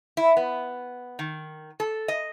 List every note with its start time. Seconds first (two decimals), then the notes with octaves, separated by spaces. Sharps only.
0.17 E4
0.37 B3
1.19 D#3
1.80 A4
2.08 D#5